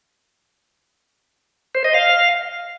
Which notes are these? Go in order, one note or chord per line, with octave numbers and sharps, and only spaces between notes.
C5
D#5
F5